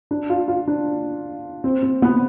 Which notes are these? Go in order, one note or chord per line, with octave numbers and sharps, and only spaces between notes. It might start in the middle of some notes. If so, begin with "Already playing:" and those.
D4
F4
F4
D4
C4
C4
B3